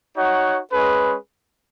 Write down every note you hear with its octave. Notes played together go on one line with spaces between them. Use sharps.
D#4 F#4 C#5 F#5
G#3 C#4 G#4 B4